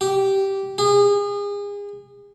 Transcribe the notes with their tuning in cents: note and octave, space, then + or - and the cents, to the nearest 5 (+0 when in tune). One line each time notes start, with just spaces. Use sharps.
G4 -10
G#4 -35